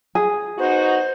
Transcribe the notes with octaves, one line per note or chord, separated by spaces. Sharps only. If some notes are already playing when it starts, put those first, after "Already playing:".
G#4
B3 D#4 F#4 C5